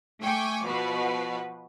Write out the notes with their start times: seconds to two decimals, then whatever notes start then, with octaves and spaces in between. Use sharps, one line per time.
0.21 A3 G5 G#5 C#6 D6
0.65 B2 F3 F#4 B4